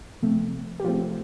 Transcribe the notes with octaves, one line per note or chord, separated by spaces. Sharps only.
C3 F3 A3 C4
G4
C3 F3 A3 C4 F4